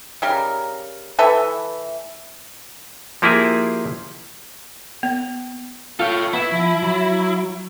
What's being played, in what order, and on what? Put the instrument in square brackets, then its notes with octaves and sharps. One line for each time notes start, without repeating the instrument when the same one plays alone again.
[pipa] C#3 G3 A#4
E3 A4 B4 E5
[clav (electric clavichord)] F3 A#3 E4 G4 G#4
[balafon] B3
[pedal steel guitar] F4 F5 G5 [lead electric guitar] A4 C#5
[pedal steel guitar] B3 E5 [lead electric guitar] E4
[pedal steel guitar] F3
F#3